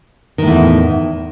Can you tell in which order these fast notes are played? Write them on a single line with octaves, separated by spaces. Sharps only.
D#3 A2 E2